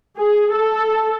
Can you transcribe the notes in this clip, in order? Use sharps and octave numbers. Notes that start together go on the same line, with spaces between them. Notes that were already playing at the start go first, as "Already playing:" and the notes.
G#4
A4